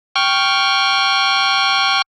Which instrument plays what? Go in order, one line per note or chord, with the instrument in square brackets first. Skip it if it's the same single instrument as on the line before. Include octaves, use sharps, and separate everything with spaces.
[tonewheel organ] G5 C#6 F6